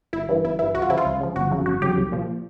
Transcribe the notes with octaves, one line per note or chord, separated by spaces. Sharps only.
G1 E4
G2 E3
G1 E4
G2 E3 E4
C#2 F#4
F4
C#3 F3 E4
F4
C#2
C#3 F3
G1 F#4
F2 C#3 F#3
G1 F#4
F2 C#3 F#3 G4
C2
A#2 F3